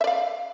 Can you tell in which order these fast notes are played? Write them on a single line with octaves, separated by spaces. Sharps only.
E5 D5 F5